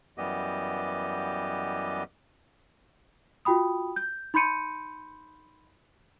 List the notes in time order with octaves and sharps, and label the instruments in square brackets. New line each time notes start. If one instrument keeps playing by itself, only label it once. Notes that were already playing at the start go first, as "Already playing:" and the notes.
[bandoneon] F#2 E3 G3 B3 G4 D#5
[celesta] F4 F#4 G5 B5 D#6
G6
D#4 B5 C6 G6 C#7 D#7